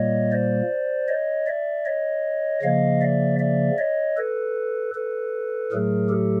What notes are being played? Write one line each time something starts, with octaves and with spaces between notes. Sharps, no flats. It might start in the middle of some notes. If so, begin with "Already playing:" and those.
Already playing: A#2 G3 A#3 C#5 D#5
C5 D5
C#5 D#5
D5 E5
C#5 D#5
C#3 F3 A#3 D#5 F5
D5 E5
D5 E5
C#5 D#5
A4 B4
A4 B4
A2 F#3 A3 G#4 A#4
G4 A4